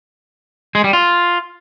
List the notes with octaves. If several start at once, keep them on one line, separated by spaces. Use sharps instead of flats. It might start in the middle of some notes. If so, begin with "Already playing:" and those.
G#3
G3
F4